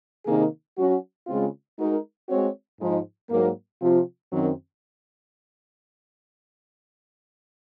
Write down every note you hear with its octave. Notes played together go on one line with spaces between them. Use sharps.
C3 D#3 A#3 D#4 G#4
F#3 C#4 F#4
C#3 G#3 C4 F4
G#3 D#4 F#4 A#4
G#3 C4 F#4 C#5
G#2 F3 G#3 D#4
G#2 F#3 A#3
C3 F3 C4 F4
F#2 D#3 F#3 C4